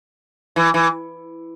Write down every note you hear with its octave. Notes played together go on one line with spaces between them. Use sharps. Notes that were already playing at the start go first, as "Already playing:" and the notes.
E3
E3